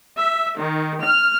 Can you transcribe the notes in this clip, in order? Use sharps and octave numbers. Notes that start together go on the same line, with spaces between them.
E5
D#3
F6